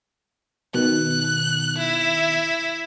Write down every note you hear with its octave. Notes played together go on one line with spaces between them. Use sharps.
B2 D#3 F#6
E4